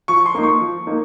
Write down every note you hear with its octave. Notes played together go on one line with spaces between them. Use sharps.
F3 C#6
C6
A#3 D#4
C#6
F3
A#3 D#4